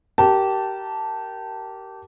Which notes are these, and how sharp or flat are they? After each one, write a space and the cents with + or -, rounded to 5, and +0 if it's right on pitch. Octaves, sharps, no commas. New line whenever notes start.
G4 -20 A#4 +0 A5 +0